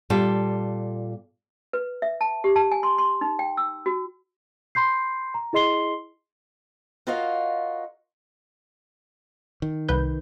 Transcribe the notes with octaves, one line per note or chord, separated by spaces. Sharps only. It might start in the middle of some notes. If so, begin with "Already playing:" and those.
A#2 G3 F4 A4
B4
E5
A5
G4
A5
G#5
C6
C6
D#4
G5
E6
F#4
B5 C6 G6 C7
A#5
E4 G#4 D#5 C6 C7 G7
F4 F#4 A#4 C#5 D#5 F5
D#3
C2 B4 G6